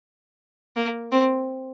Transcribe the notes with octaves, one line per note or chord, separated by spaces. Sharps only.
A#3
C4